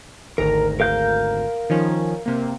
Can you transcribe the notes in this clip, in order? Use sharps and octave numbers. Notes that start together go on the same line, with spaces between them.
G#1 D2 A#4 A#5
A#4 F5 G6
D#3 F3 C#4
C3 A#3